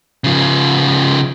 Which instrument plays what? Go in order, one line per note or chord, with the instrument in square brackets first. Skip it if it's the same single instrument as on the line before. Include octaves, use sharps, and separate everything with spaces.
[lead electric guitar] C#3 F3